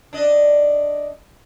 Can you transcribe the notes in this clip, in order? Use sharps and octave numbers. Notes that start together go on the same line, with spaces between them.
D4 D#5